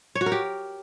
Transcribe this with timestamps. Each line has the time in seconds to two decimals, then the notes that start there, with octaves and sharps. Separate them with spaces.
0.15 C#5
0.21 F#4
0.26 A#4
0.32 G4